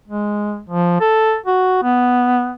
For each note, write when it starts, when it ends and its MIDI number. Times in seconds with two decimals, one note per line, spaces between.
0.08 0.61 56
0.69 0.96 53
1.00 1.36 69
1.46 1.81 66
1.83 2.53 59